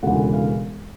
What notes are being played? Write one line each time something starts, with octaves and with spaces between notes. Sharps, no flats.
E1 D2 C#3 E3 F#5
F5